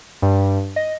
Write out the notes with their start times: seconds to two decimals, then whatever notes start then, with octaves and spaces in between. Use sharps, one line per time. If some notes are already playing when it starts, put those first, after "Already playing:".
0.22 G2
0.76 D#5